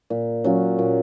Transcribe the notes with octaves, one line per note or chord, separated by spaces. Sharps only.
A#2
F#3 C#4 F4
A#2